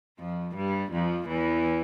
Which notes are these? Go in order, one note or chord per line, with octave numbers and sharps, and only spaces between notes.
F2 F3
G2 G3
F2 F3
E2 E3